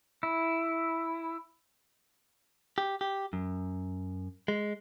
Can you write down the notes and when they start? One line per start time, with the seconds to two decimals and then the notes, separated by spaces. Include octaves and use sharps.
0.23 E4
2.78 G4
3.01 G4
3.33 F#2
4.48 G#3